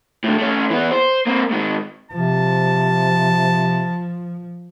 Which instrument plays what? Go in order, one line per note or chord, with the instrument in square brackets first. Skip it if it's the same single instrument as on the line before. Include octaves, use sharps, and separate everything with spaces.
[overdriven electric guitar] A2 D3
A3 C#4
E3 B3
C5
A#3 C4
G#2 D#3
[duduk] C3 [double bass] F3 [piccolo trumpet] A5